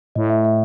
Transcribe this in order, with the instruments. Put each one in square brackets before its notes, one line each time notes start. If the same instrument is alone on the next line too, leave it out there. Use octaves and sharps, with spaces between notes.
[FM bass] A2 [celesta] D#5
[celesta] E5
E5